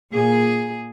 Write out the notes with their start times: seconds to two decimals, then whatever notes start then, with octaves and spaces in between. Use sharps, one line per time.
0.13 A#2 G#4